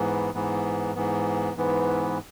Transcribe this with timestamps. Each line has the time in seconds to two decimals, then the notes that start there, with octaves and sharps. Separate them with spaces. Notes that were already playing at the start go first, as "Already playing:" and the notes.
Already playing: G#2 E3 B3
0.34 G#2 E3 B3
0.95 G#2 E3 B3
1.57 G#2 E3 B3